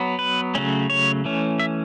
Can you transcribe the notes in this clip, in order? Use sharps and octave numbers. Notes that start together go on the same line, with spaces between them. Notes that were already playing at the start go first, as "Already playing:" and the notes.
Already playing: F#3 B3
B4
C#3 F#3 A3 C#4
C#5
E3 A3 C#4
E5